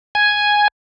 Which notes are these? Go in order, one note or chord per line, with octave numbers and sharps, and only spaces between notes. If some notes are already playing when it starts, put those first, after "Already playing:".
G#5